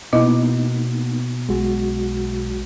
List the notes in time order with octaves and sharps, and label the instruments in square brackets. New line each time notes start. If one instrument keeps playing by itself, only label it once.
[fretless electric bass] B2 [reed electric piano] A#3 B3 D#4 [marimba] E4 D#5
[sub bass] B1 [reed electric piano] G#3 F#4